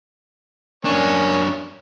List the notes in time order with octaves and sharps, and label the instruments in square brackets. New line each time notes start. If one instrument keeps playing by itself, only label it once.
[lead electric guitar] F#2 D4 [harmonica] A#3 C#4 C#5